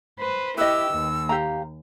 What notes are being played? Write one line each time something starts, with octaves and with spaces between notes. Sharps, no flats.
B4 C5
E4 G4 B4 D#5 E6
D#2
G4 F5 A#5